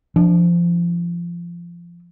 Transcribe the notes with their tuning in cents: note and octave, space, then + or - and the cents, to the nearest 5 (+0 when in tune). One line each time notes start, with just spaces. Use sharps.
F3 -20 D4 +0